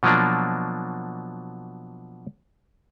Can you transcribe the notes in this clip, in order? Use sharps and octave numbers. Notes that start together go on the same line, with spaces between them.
B2 F3 F#3 A#3 D4